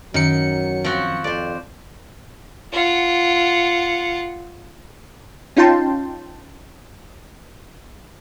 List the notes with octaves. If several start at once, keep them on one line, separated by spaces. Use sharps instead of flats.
F#2 D#3 F#3 C#7
F3 C4 F#4
F2 C5 D5
F4 F#5
C#4 D#4 F4 G5 A5 C6